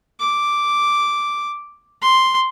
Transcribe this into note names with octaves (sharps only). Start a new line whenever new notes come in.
D6
C6